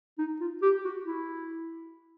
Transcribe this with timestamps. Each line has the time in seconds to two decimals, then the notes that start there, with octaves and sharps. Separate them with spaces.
0.19 D#4
0.40 F4
0.62 G4
0.85 F#4
1.05 E4